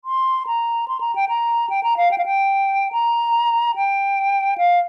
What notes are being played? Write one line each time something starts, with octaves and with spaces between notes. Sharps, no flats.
C6
A#5
C6
A#5
G5
A#5
G5
A#5
F5
G5
F5
G5
A#5
G5
F5